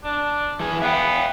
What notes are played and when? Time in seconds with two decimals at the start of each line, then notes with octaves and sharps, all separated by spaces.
0.04 D4
0.60 E3 G#4
0.82 B3 E5 F5 G5